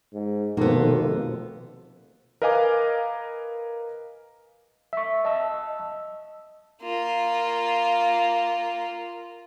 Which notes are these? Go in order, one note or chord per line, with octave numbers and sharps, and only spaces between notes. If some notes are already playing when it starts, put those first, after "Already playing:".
G#2
F1 B2 D#3 F3 A#3 B3 A4
A#4 B4 D#5 F5 G#5 D6
E5 C#6
D#5 A5 E6
A#3 F4